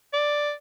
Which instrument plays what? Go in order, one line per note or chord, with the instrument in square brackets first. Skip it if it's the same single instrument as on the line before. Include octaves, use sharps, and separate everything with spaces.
[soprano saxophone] D5